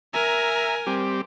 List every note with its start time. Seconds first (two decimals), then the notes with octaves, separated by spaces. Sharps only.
0.14 A#4 E5 G#5 A#5
0.87 G3 C4 G4